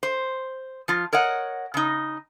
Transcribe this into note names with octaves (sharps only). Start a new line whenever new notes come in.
C5
F3 F4
A#4 C#5 D#5 F#5
C#3 D#4